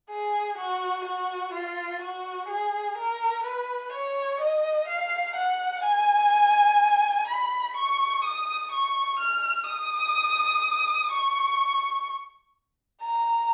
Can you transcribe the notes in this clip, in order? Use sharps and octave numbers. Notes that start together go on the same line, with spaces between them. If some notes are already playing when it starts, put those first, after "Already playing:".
G#4
F#4
F#4
F4
F#4
G#4
A#4
B4
C#5
D#5
F5
F#5
G#5
B5
C#6
D#6
C#6
F6
D#6
C#6
A#5